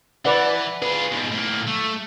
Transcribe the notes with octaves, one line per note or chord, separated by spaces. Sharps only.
E3 B4 D5 F#5
F4 G#4 B4
G#2 B2
A2 A#3
A3